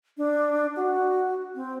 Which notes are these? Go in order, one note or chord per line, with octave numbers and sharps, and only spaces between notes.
D4
F#4
C4